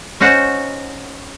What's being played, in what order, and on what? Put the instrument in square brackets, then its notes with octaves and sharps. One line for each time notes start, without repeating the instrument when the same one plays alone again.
[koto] C#4 D#4 F#4 C5